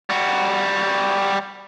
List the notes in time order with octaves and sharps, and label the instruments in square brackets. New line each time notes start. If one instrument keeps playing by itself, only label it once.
[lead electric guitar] G3 F#4